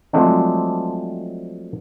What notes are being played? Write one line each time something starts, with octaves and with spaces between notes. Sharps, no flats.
F3 F#3 G#3 A3 C4 D4